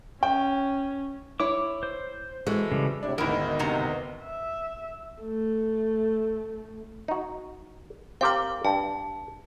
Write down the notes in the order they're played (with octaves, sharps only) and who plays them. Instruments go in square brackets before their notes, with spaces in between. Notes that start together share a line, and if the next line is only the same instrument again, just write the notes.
[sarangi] C#4 [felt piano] G5
[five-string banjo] E4 C#5 [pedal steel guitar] D6
[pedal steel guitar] C5
[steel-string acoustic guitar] E3 G#3 A4 [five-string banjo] F#4
[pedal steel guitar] C#3 G3
[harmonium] A2 C3 E4 [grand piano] D4
[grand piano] D2 G#2 [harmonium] B2 D#3 [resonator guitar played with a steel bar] E4 A#4
[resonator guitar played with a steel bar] G2 C3 A#5
[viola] E5
A3
[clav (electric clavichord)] D#4 F#4
[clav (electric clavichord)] C4 G4 A#4 [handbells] F5 D6
[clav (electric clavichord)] G2 [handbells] A5